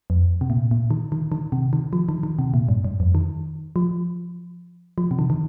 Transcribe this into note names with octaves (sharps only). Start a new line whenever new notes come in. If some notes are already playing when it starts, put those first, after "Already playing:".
F2
C3
A#2
A#2
D#3
D#3
D#3
C3
D#3
F3
D#3
D#3
C3
A#2
G2
G2
F2
D#3
F3
F3
C3
D#3
D#3